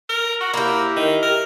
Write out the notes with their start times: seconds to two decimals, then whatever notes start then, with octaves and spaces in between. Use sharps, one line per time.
0.09 A#4
0.41 F#4
0.54 A#3 E4 G4
0.97 D#3
1.22 A#4